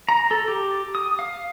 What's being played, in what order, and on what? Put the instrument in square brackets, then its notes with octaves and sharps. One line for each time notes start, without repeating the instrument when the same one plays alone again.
[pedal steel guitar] A#5
A4
G4
D#6
F5